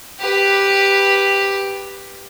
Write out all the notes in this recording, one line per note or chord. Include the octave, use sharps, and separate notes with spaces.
G4 B4